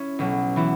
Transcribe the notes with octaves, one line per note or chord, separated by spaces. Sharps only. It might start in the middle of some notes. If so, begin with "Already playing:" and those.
Already playing: C#4 E4
B1 B2 F#3
E3 B3 E4